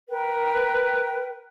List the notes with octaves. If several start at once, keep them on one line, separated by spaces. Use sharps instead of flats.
A#4 B4 G5